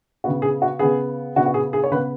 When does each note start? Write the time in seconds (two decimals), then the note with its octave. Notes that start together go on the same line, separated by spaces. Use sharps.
0.24 C#3 B3 F#4
0.42 G#4
0.62 F#4
0.79 C#3 B3 G#4
1.36 C#3 B3 F#4
1.46 F#4
1.54 G#4
1.73 G#4
1.84 C#5
1.91 C#3 B3 B4